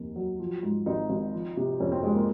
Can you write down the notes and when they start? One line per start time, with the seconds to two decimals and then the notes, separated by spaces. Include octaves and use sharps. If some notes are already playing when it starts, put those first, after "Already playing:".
Already playing: F1 D#2 D#3 D#4
0.16 F#3
0.40 F3
0.63 G#2
0.86 G#1 D#4
1.10 G#1
1.33 F3
1.57 C3
1.80 F2 C#4
1.92 C4
2.03 F2 G#3
2.15 A#3